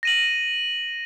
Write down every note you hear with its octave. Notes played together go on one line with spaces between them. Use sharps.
A#6 D#7 F#7